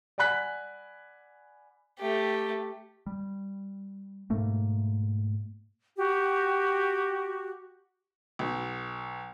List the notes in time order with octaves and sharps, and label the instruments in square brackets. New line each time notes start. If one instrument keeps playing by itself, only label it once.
[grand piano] D5 F#5 G#5 B5 F#6 B6
[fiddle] A3 G4
[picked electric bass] G3
G#2 B2 A3 A#3
[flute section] F#4 G4
[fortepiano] B1